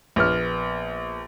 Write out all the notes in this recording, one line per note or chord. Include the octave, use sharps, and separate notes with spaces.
A#1 B3 F6